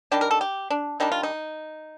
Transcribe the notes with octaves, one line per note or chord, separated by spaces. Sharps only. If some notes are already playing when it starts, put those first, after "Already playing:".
D#3 G3 D4 G4
A#4
A4
G4
D4
D#3 G3 D4 D#4
F4
D#4